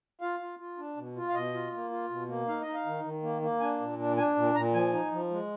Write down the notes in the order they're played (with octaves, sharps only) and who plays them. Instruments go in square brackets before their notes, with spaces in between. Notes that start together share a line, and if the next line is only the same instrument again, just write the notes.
[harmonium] F4 F5
F4
F4
D4
B2
F4
F5
B2 D#5
F4
A#3
F4
B2
A#3
D#4 F5
D#4 D#5
F5
D#3
D#3
A#3
A#3
D4 G#5
A#2
D4
D4 G#5
A#2
A#2 A#5
F3 G#5
D#4
F3
G#3